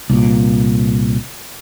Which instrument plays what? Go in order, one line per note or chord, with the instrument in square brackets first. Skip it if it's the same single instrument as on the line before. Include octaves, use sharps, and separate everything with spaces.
[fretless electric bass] C2 A#2